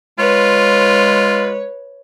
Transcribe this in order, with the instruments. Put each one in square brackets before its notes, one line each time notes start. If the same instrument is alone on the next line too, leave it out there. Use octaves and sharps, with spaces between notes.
[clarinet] G#3 [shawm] F4 [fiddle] B4 [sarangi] C#5